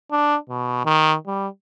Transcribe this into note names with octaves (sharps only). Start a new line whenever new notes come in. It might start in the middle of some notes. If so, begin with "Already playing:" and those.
D4
B2
D#3
G3